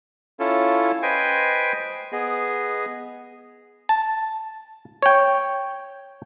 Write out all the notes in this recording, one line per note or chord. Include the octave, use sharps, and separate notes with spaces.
C#4 E4 F4 A4
B4 C5 D#5 G5 G#5
B3 G#4 D#5
A5
C#5 G5